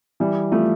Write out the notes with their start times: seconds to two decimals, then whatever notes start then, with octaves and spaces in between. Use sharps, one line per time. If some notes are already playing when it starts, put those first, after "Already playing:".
0.20 E3 G3
0.52 F3 A3